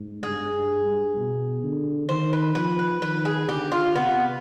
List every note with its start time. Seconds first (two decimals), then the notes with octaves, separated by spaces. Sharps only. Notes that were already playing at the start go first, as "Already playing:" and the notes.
Already playing: G#2
0.23 G2 G#4
0.54 G2
0.85 G2
1.16 B2
1.63 D3
2.09 D#3 C5
2.33 B4
2.55 F3 B4
2.79 B4
3.02 D#3 B4
3.25 G#4
3.49 D3 G4
3.72 F4
3.96 C3 B3